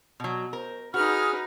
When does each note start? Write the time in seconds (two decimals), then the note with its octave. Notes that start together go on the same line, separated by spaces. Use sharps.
0.20 B2 F#3
0.53 A#4 C5
0.94 D#4 F#4 G#4 B4 F6